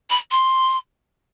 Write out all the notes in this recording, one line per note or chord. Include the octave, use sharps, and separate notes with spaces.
B5
C6